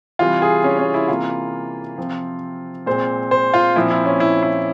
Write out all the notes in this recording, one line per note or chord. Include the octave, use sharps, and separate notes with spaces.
C3 E3 G3 F4
G#4
C#4
C#4
E4
C3 E3 A#3 F4
C3 F3 C4
A#2 G#3 C4 C5
C5
F4
A#2 F3 C4 E4
E4
C#4
E4
E4